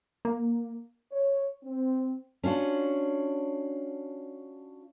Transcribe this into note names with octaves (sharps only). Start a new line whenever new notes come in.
A#3
C#5
C4
C#4 D4 F4 F#4